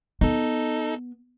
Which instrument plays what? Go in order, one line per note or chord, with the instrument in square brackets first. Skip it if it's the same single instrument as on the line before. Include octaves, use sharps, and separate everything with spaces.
[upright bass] B3 [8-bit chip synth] D#4 A4